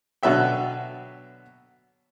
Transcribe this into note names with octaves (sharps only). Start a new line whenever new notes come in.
B2 D3 F#3 B4 E5 G5